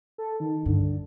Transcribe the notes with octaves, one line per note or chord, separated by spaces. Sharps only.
A4
D#3
G2 D3